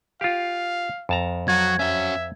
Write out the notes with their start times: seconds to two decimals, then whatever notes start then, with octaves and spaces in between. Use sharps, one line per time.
0.21 F4 G4 F5
1.09 F2 A5 A#5
1.48 F#3 F#4 G#6
1.79 C#4 F#4 E5